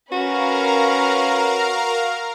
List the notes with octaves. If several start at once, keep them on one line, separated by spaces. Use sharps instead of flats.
C#4 F#4 A#4 B4 F5 A#5